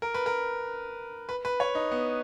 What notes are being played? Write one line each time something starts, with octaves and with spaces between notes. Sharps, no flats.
A#4
B4
A#4
B4
B4
C#5
D#4
B3